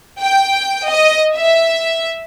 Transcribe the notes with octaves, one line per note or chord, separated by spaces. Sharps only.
G5
D#5
E5